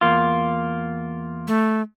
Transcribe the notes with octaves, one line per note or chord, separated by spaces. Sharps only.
E2 A#3 F4
A3